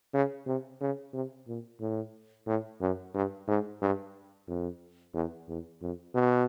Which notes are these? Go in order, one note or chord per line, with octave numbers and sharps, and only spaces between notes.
C#3
C3
C#3
C3
A#2
A2
A2
F#2
G2
G#2
G2
F2
E2
E2
F2
B2